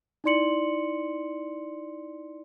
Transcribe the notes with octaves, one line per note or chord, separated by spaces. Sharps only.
D#4 E4 D5 C6 C#7 F#7